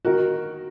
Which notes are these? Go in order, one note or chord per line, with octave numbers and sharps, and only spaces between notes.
D#3 A#3 D#4 F#4 A#4